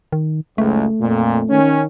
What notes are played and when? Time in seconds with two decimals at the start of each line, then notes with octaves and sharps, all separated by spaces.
0.12 D#3
0.58 F#1 C#2 A3
1.00 F2 A#2
1.49 D#3 C#4